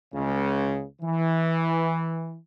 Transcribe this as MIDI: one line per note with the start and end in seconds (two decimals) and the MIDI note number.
0.14 0.85 37
0.14 0.85 49
1.01 2.38 52